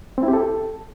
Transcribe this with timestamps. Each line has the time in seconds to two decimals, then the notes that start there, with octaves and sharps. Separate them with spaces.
0.18 C4
0.23 E4
0.28 G4
0.33 A4